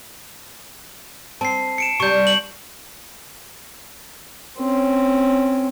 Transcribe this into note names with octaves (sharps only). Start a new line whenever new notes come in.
C4 A5 C7
C#7 D7 E7
C3 G3 C#6 G6
F#7
C4 C#4